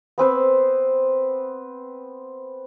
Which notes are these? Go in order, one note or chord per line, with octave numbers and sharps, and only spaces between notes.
B3 C4 B4 C5